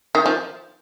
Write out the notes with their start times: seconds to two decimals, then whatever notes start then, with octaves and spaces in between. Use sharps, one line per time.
0.15 D#3
0.26 F3